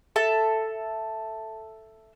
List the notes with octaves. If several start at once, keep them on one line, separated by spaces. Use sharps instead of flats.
A4 E5 A5